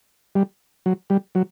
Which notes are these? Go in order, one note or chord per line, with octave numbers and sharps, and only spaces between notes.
G3
F#3
G3
F#3